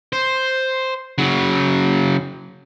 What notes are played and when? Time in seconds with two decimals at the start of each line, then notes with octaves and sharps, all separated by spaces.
0.13 C5
1.18 C#3 F#3